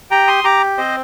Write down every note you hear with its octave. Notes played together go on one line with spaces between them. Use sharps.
G4 G5 A#5
C6 D#6
G4 A#5 D6
C4 C5 D#5